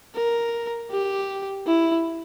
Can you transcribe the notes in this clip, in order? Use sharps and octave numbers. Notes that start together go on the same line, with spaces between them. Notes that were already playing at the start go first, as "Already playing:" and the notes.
A#4
G4
E4